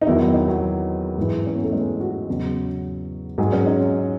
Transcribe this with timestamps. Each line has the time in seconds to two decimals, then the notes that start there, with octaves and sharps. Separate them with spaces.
0.01 D#4
0.07 E2 D#3 F#3 E4
0.21 E4
0.34 D#4
0.48 F#3
1.18 G#2 E3
1.46 C#4
1.55 B3
1.63 A3
1.72 G#3
2.00 F#4
2.28 E2 C#3 F#3
3.38 G#2 F#3 G#4
3.52 C#4
3.66 D#4